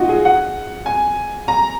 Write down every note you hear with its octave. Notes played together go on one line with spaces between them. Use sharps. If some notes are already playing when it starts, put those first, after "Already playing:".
Already playing: D#4 F4 F#4
G#4
F#5
G#5
A#5